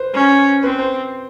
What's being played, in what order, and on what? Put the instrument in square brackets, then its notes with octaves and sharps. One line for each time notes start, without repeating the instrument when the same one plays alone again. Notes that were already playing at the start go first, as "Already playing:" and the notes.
Already playing: [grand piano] B4 C5
[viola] C#4
[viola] C4 [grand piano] B4
[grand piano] C5